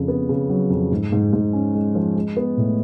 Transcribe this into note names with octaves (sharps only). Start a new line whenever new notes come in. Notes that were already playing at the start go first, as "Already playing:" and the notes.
Already playing: F2 C#3
B3
C#3
F#3
F2
G#2
G#2
G#2
C#4
G#3
F3
G#3
B3
A2